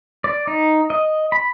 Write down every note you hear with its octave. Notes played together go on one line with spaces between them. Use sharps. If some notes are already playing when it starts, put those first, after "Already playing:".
D5
D#4
D#5
B5